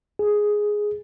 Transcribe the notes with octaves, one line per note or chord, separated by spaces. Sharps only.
G#4